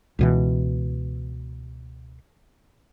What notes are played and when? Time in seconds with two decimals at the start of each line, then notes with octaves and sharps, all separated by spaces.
0.19 C#2 B2 E3